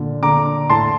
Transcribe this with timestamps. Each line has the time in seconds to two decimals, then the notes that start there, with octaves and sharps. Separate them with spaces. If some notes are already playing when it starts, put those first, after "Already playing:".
Already playing: A#2 D3
0.22 D3 A#5 D6
0.70 A2 A5 C6